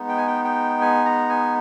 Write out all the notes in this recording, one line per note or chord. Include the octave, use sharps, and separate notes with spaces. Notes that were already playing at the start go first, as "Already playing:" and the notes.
Already playing: G#3 B3 D#4
G5
G#5
G5
G5
G#5
A#5
G#5